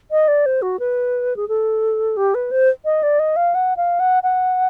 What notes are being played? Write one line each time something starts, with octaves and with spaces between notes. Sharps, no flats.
D#5
D5
C5
F#4
B4
G#4
A4
G4
B4
C5
D#5
D5
D#5
F5
F#5
F5
F#5
F#5